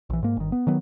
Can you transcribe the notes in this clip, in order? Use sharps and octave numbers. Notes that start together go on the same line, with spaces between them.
A#1 E3
G#2 A#3
G1 D#3
B3
D#3 F#3 B3